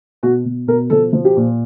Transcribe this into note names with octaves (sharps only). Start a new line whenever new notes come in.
B2 F#4
B2
B2 A#4
F3 A4
F3
G4
A#2